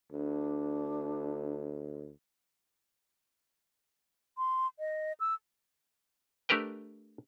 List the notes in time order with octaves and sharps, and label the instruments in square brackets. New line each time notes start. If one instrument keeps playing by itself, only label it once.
[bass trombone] D2 [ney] D4
[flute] C6
D#5
E6
[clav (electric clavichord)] A3 D4 G4 A#4 B4 G5